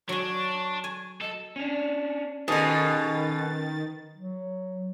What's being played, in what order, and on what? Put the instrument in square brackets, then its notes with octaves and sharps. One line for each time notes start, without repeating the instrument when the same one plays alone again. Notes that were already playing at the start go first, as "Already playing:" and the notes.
[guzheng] F#3 G#5 [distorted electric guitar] D4 [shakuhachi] C#6
[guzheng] G#5
[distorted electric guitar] A4 [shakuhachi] D#5
[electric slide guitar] C#4 D4
[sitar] B2 [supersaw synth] D#3 A6 [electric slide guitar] C#4 A4 [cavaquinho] G#4 D#5
[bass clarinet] F#3